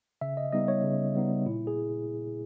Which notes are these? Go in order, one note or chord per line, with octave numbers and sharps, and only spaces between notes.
C#3 E5
D#5
G3 B3 D#4 D#5
C#5
C#3
G3 B3 D#4
A#2 E4
G#4